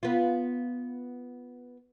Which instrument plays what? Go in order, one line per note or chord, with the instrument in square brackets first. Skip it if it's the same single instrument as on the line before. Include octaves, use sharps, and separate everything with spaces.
[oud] B3 F4